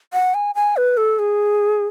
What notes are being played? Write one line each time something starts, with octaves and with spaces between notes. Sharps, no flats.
F#5
G#5
G#5
B4
A4
G#4